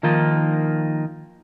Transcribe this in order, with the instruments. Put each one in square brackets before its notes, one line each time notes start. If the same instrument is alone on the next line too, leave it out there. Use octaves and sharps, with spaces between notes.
[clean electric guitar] D#3 F3 A#3 D#4 F4